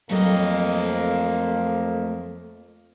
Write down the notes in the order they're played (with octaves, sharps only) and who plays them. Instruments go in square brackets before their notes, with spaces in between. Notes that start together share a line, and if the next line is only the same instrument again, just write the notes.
[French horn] F2 [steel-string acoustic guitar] F#3 A4 G5 [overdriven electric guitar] A3 D#5 [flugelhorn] A#3